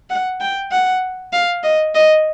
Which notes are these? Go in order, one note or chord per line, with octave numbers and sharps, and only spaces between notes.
F#5
G5
F#5
F5
D#5
D#5